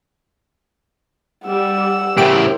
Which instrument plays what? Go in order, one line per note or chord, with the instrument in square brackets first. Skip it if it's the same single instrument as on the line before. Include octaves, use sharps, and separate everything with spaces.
[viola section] G3 [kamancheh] F#5 E6
[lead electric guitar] A2 C#3 [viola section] E4 A#4 C5 [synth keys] G4 D7